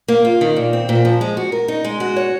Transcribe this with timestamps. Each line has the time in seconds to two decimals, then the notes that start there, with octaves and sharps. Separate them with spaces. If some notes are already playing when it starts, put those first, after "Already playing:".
0.08 A#3
0.25 F4
0.41 D#3
0.57 A#2
0.73 C4
0.89 A#2
1.05 F3
1.21 G#3
1.37 F#4
1.52 A#4
1.68 D#4
1.85 G#3
2.00 F#4
2.16 C#5